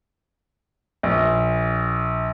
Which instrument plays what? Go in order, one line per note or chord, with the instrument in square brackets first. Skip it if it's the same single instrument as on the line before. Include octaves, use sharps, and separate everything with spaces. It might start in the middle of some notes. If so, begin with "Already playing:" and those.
[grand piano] A#1